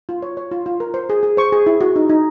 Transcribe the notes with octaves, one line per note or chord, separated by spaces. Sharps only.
F4
C#5
C#5
F4
F4
A#4
C5
G#4
G#4
C5 C#6
G#4
E4
F#4
D#4
D#4